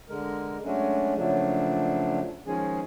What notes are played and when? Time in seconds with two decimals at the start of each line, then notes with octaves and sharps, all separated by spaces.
0.09 D3 G#3 A#4
0.64 F#3 G#3 A3 C#4 D4
1.16 A#2 C#3 F3 F#3 A3 D4
2.46 D#3 F3 G#3 C#4 G#4